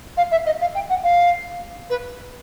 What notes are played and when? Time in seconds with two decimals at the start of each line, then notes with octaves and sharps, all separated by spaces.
0.17 F5
0.31 E5
0.46 D#5
0.61 F5
0.75 G5
0.89 F#5
1.04 F5
1.90 B4